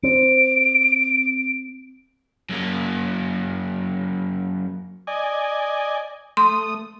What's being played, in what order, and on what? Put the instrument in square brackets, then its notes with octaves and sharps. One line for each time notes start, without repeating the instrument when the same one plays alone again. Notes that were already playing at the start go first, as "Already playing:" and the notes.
[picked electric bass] C4 [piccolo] D7
[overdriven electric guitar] F#2 A#3
[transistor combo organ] D5 D#5 G#5
[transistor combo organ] A3 D#6 [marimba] C6